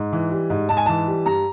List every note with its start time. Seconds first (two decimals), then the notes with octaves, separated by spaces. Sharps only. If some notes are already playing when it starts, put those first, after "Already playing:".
Already playing: G#2
0.13 E3
0.32 G3
0.50 G#2
0.69 G#2 A5
0.77 G#5
0.86 E3 A5
1.08 G3
1.26 G2 A#5